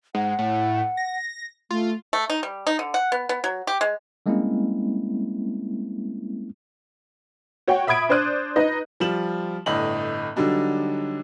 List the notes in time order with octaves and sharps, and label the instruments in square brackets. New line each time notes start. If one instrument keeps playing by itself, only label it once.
[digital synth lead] G#2 [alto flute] F#5
[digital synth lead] A2
A#6
[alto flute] A3 [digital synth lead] F4
[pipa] A3
D#4
G3
D#4
D3
F#5
B3
B3
F#3
G4
G#3
[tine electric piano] G3 G#3 A#3 C4 C#4 E4
[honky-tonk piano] F#4 C#5 F#5 G5
E5 B5 D#6 G#6 D7
D4 C5 D5 F#6 D#7
D#4 B4 D#5
[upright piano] F3 G3 F4 E7 F#7
G1 A2 D#5 F#7
D3 F#3 G3 D4 D#4